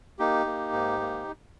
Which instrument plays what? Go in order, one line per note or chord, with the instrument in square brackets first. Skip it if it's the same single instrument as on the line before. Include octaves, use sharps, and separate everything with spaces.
[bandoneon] A#3 D#4 G4
A#3
G#2
A#3